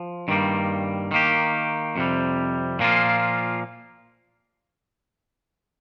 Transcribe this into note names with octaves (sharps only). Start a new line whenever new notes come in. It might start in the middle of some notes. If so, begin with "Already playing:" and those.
Already playing: F3
G2 D#3 G3 A#3
D#3 A#3 G4
F2 C3 G3
A#2 F3 A#3 F4